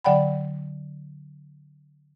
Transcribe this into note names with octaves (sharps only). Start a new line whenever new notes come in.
D3 F#3 D5 F#5 G5 B5